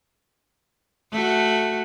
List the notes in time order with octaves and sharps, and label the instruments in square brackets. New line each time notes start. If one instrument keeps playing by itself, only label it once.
[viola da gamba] A3 F#4